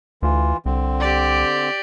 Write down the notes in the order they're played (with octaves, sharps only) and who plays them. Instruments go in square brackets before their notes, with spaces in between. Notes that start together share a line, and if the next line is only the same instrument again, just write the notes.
[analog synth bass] D2 [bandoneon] E3 F4
[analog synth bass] C2 [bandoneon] D3 C4
[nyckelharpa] G4 D5